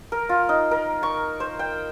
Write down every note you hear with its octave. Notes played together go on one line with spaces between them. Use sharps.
A#4
F4
D#4
A#4
C#6
C5
G5